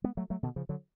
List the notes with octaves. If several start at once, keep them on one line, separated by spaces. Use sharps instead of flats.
G#3 B3
F#3 A3
F#3 A3
B2 D3
C#3 F3
D3 F#3